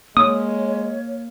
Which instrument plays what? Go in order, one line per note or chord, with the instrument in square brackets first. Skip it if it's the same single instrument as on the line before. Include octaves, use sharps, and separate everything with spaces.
[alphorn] G#3 [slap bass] A#3 [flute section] C#5 [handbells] D#6